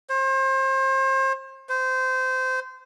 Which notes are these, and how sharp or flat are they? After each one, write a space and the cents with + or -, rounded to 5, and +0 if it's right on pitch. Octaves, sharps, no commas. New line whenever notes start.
C5 +35
C5 -20